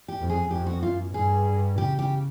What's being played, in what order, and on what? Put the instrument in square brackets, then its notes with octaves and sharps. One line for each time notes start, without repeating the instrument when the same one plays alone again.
[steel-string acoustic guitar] G4
[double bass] F2
[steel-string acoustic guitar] G#4
[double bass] F2 [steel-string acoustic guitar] G4
[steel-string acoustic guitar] F#4
[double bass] F#2 [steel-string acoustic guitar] F4
[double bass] G2 [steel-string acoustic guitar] G#4
[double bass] C#3 [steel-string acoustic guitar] G4
[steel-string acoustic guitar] G4